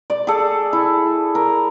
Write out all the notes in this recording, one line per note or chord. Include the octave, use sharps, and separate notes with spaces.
D5
G#4 A4
E4
A#4